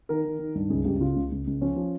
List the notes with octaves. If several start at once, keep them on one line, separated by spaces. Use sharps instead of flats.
D#3 A#4
D#3
D#3
G2
C#2 G#4
C#2 G4
G4
C#3 F4
C#2
C#2
C#2
F3 C#4
F3